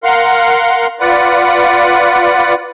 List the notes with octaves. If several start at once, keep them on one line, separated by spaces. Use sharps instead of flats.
A#4 F5 F#5 C6
F4 B4 D5 F#5